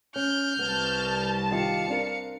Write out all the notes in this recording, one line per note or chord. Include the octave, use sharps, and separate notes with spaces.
C#4 F6 G6
C2 B3 A5
D#3 F4 G4 F5 C#7
C4 D4 A#4